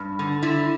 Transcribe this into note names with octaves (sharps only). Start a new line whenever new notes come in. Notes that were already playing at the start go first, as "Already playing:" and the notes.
Already playing: G2
D3
D3 E4